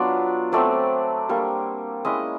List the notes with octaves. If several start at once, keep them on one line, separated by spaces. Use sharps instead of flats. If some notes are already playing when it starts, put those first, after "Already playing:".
Already playing: F#3 B3 D4 F4 D5
F#3 A3 C4 D5
G3 A#3 D4
G#3 C#4 E4 D#5